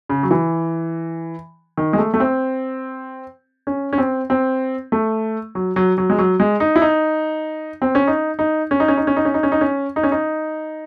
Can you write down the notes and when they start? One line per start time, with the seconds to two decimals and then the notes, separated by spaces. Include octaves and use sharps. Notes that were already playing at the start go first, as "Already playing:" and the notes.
0.09 C#3
0.23 F#3
0.31 E3
1.77 D#3
1.93 G#3
1.98 A3
2.14 A3
2.20 C4
3.67 C#4
3.93 C#4
3.98 C4
4.30 C4
4.92 A3
5.55 F#3
5.76 F#3
5.98 F#3
6.10 G#3
6.18 F#3
6.40 G#3
6.60 D#4
6.76 E4
6.82 D#4
7.82 C4
7.95 C#4
8.07 D#4
8.39 D#4
8.71 C#4
8.80 D#4
8.88 C#4
8.97 D#4
9.07 C#4
9.17 D#4
9.25 C#4
9.34 D#4
9.43 C#4
9.52 D#4
9.61 C#4
9.96 D#4
10.03 C#4
10.12 D#4